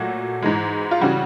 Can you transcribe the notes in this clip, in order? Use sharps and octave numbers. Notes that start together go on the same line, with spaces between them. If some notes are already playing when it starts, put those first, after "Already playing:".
Already playing: A#2 F#3 A3 F#4
G#2 E3 G#3
F4
C#3 E3 G3 F#4